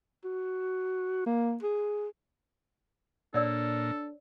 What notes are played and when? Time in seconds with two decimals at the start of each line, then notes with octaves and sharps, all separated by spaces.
0.24 F#4
1.26 A#3
1.62 G#4
3.34 A#2 D4 A4 C#5 D5 E6